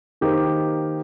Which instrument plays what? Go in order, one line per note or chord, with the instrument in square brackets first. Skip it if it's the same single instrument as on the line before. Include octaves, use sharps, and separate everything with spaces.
[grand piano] D#3 A#3 D#4 G4 C5